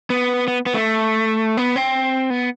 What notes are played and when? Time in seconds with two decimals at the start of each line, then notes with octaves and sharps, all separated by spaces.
0.10 B3
0.48 B3
0.66 B3
0.74 A3
1.57 B3
1.76 C4
2.30 B3